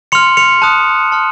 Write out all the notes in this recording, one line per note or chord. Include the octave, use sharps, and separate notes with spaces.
C6 F6 C#7 F7
C#7 F7
A5 D#6 F#6
A5 C6 F6